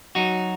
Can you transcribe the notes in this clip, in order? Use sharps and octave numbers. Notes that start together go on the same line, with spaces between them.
F#3 D#4 F#4